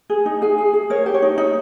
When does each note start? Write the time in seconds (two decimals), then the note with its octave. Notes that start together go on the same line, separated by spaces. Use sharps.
0.10 G#4
0.26 D#4
0.42 G#4 G#5
0.58 G#4
0.73 G#4
0.90 A#4 C#5
1.06 G4
1.14 C#5
1.22 D#4
1.38 D#4